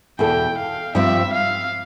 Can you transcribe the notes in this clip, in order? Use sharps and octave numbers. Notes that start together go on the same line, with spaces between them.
E2 B2 B3 E4 A4 G5
F5
G2 F3 C4 G4 E5
F5